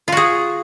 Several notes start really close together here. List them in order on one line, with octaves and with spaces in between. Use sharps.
F4 F#4 G#4